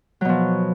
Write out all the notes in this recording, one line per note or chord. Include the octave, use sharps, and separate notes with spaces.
B2 F3 F#3